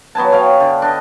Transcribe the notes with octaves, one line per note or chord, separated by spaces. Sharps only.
F#3 B3 G#5 A5
C#5 F5 G5
D3
D4 D#5